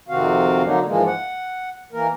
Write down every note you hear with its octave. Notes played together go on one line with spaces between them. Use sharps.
F2 C3 D#3 C4 F#4 F5
D3 F#3 A#3 D4 D#4
G#2 E3 F3 G#3 A#3
F#5
E3 A#3 A#4